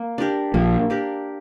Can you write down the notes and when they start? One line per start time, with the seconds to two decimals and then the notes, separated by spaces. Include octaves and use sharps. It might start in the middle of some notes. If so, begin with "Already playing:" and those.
Already playing: A#3
0.18 D4 G4 A#4
0.54 A#1 A#2 A#3
0.90 D4 G4 A#4